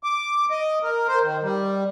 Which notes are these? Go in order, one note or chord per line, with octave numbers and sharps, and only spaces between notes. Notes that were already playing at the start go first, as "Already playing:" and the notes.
D6
D#5
A#4
C5
D#3
G3